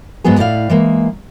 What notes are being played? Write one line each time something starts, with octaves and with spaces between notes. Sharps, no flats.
G#2 F#3 G#3 B3 G#4
A2 E4 D5 E5 F5
E3 G#3 A#3